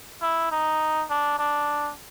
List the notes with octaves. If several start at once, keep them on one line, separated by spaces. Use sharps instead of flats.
E4
D#4
D4
D4